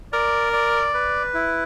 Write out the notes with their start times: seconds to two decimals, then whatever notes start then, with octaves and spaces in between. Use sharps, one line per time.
0.13 A#4 D5
0.53 D5
0.94 B4
1.34 E4